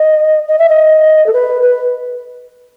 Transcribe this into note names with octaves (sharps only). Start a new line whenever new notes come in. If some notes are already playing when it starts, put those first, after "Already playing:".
Already playing: D#5
D#5
E5
D#5
A4
B4
B4